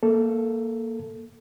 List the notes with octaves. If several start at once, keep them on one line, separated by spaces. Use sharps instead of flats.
A#3 A4